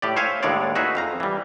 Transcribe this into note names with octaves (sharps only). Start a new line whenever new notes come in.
A2 G4 D5
C5 C#5 E5 F5 G#5
D#2 A2 G#3 D4 C#5 D5
D#4 F#4 G#4 B4 E5
F2 F5 A#5
E3 G3